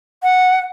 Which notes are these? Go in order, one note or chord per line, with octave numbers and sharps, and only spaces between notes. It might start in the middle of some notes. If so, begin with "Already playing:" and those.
F#5